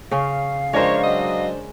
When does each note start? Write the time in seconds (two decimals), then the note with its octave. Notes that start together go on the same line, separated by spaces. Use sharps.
0.11 C#3 C#4 F5
0.73 F3 G#3 C#4 D4 A#4 C5 C#5
1.04 F#3 D#5